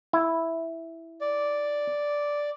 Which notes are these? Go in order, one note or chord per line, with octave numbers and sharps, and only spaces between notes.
E4
D5